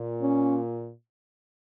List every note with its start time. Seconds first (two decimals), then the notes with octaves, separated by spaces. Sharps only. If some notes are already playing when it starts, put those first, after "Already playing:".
Already playing: A#2
0.22 C#4